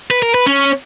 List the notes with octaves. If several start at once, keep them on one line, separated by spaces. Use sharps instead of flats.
B4
A#4
B4
C#4